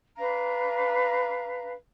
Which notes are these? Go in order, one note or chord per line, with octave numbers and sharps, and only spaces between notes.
D4 B4 F5 A#5